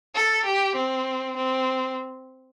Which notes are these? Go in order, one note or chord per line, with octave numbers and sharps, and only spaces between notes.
A4
G4
C4
C4